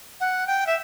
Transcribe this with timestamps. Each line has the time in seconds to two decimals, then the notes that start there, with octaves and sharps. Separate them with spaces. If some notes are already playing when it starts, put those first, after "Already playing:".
0.20 F#5
0.47 G5
0.67 E5